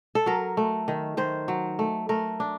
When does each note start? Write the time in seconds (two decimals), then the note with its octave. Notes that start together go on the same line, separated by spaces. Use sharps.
0.15 A4
0.26 F#3 A#4
0.57 A3
0.88 D#3
1.17 D#3 C5
1.48 F#3
1.79 A3
2.09 A3 A#4
2.40 D4